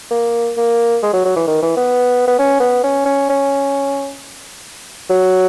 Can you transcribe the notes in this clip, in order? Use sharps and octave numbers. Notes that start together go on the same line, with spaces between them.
A#3
A#3
G#3
F#3
F#3
E3
D#3
E3
B3
B3
C#4
B3
C#4
C#4
C#4
F#3